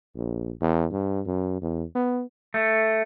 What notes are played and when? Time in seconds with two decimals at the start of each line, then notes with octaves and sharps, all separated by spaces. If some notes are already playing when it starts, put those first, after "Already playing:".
0.16 A#1
0.61 E2
0.92 G2
1.26 F#2
1.62 E2
1.95 B3
2.54 A3